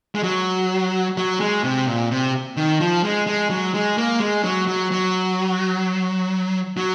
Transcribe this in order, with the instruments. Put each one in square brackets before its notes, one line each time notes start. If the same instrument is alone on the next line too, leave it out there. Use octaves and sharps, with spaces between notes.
[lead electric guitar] G#3
F#3
F#3
G#3
C3
A#2
C3
D#3
F3
G#3
G#3
F#3
G#3
A#3
G#3
F#3
F#3
F#3
F#3